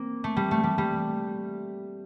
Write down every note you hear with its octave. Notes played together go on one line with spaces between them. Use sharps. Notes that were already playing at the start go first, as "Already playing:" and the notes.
Already playing: A#3 C4
A3
G3
A3
G3
G3